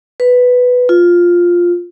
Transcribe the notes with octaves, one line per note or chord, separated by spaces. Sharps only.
B4
F4